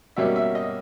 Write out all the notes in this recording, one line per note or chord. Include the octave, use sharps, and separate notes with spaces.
B2 G3 A#3 C#4 E5
E5
D#5